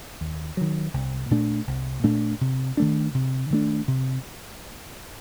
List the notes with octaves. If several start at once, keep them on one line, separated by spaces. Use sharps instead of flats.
D#2
D#3 F#3
C2
A#2 A3 D4
C2
A#2 A3 D4
C3
D#3 A3 D4
C3
D#3 A3 D4
C3